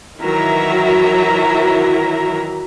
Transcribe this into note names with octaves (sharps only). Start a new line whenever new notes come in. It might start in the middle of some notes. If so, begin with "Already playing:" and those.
D#3 E3 F#3 E4 E5 A#5